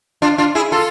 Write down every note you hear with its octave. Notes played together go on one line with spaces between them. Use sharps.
D4 F4
D4 F4
E4 G#4
F4 A4